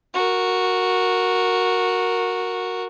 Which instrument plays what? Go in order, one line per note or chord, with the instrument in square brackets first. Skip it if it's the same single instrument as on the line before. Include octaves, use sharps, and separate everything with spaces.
[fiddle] F#4 A#4